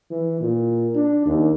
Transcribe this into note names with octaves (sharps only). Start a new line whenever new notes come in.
E3
A#2
D4
D#2